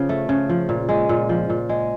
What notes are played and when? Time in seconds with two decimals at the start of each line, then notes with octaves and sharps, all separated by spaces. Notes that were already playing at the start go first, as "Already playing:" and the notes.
Already playing: C#3 F3
0.09 A3
0.29 C#3
0.49 F3
0.69 A#2
0.89 G#3
1.09 A#2
1.29 F3
1.50 A#2
1.69 G#3